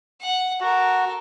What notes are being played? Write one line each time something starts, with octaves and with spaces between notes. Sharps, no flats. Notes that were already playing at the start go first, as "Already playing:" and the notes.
F#5
F#4 A4 A#4